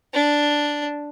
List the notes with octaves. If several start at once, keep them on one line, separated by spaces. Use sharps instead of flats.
D4